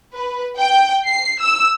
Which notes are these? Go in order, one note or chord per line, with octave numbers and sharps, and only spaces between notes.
B4
G5
C7
E6